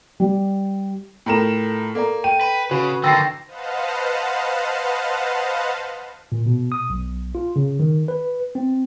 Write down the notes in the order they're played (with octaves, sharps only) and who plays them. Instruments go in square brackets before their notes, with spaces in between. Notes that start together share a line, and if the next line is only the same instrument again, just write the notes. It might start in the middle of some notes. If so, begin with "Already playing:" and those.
[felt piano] G3
[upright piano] A2 A#4 E7 [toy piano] F4 A4 G5
[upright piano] A#3 [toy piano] A4 D5 A#5
[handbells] G5 [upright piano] D#7
[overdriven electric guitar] B4
[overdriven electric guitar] C#3 [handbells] F#4 B4 [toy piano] B5
[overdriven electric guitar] D3 D#3 [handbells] G5 A#6 [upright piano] E6 A6 C7
[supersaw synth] B4 C5 D#5 F5 F#5 A5
[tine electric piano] A#2
B2
D#6
B1
F4
C#3
D#3
B4
C4